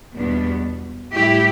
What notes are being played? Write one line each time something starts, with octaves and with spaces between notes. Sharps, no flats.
E2 B2 G3 B3 D4
A2 G3 E4 G4